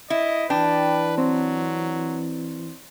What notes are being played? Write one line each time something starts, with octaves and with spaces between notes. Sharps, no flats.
E4 D#5
E3 D4 B4 G5
F#3 C4